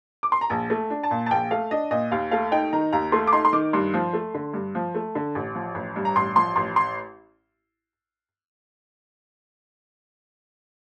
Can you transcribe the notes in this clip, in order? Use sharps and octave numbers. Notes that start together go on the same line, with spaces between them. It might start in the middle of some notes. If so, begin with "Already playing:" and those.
D6
C6
A#5
A#1 A5
A3
D4
A5
A#2
A5
A#1 G5
A3 F5
D4 D#5
A#2 D#5
D#2 F5
A3 F5
D#4 G5
D#3 A#5
D#2 A#5
A3 C6
D6
D#4 C6
C6
D#3 D6
G2 C6
F3
A3
D3
G2
F3
A3
D3
A1
F3
A1
G2
A#5
A1 C6
F3 C6
A1 C6
C6